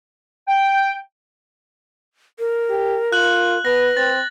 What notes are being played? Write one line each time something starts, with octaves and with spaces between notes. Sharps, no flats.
G5
A#4
G4
F4 F#6 F#7
B3 B4 A#6
C4 A6